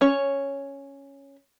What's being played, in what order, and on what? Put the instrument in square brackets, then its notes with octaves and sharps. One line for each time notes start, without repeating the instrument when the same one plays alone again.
[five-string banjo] C#4 C#5